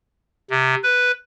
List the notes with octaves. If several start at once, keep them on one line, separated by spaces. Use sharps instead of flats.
C3
B4